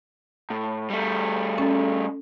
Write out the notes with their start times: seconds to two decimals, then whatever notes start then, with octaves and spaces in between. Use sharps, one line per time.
0.50 A2
0.90 G3 A3
1.58 C#4 A4